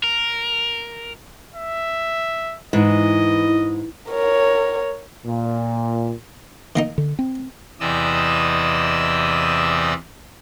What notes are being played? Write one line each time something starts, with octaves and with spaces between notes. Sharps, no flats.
A#4
E5
G#2 E3 D#5
A#4 C#5
A#2
D#3 A#3 D#4
D3
C4
E2 C3 E3 D5 D#5 E6